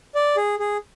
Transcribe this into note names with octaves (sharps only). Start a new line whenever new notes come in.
D5
G#4
G#4